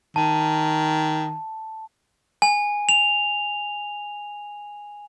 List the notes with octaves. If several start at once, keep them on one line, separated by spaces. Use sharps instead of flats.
D#3 A5
G#5
F7